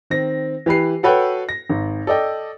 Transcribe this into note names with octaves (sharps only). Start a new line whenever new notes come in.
D#3 C4 A#6
E3 G4 B4 C7
F#4 A4 B4 C#5 F#5 G5
A#6
G#1
A4 D5 D#5 G5